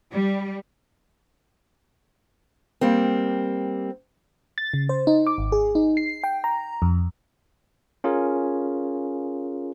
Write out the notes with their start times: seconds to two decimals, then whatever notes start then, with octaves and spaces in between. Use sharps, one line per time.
0.12 G3
2.81 G3 A#3 C4
4.58 A6
4.74 C#3
4.89 C5
5.07 D#4
5.27 D6
5.38 G#1
5.52 G#4
5.75 D#4
5.97 C7
6.24 G5
6.44 A#5
6.82 F2
8.04 C#4 F4 G#4 A#4